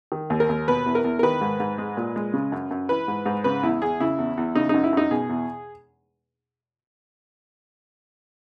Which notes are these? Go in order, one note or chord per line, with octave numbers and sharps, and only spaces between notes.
D#3
D#2
A#4
D#2
B2 B4
E2
A#4
E2
A#4
D#3 B4
G#2
G#2
G#3
A#2
G#3
C#3
F#2
F#2
E3 B4
G#2
G#2
C#3 B4
E2 E4
E2 G#4
C#3 E4
E2
E2
C#3 D#4
F#2 D#4
E4
F#2 D#4
B2 G#4
E2